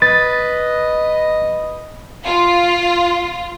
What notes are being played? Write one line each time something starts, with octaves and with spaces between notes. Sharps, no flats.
B4 D#5 A6
F4